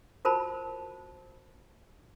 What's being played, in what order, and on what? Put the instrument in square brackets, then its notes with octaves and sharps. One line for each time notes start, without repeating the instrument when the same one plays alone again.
[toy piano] F4 F#4 A#4 C5 A5 B5